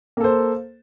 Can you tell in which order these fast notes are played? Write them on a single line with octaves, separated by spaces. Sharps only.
A#3 A4 C5